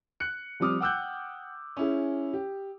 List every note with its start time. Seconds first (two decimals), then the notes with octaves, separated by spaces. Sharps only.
0.20 F#6 C#7
0.60 F3 G3 C4 D6 D#6 F6
0.80 F#5 G5 D6 E6 F#6 G6
1.77 C#4 E4 G#4
2.34 G4